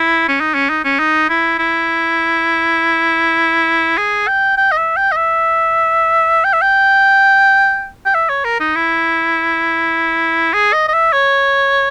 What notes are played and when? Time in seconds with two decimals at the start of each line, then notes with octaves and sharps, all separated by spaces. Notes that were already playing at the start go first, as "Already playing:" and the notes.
Already playing: E4
0.28 C#4
0.40 D#4
0.54 C#4
0.70 D#4
0.84 C#4
0.99 D#4
1.29 E4
1.59 E4
3.98 G#4
4.27 G5
4.57 G5
4.72 D#5
4.78 E5
4.97 G5
5.12 D#5
5.16 E5
6.44 G5
6.53 E5
6.62 G5
8.05 G5
8.15 E5
8.29 C#5
8.44 A#4
8.60 D#4
8.75 E4
10.54 G#4
10.73 D#5
10.88 D#5
10.93 E5
11.13 C#5